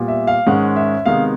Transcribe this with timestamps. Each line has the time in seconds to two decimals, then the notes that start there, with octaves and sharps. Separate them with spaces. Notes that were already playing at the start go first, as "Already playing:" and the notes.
Already playing: A#2 G3 B3
0.08 E5
0.27 F5
0.47 G#2 D#3 G#3 C#4 F#5
0.76 E5
1.06 C3 D#3 G#3 B3 F5